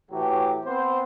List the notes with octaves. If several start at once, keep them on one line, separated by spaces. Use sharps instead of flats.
A2 E3 F#3 G4
B3 C4 C5